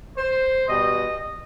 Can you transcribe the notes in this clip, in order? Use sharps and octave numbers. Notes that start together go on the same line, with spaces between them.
C5
B2 G3 D#5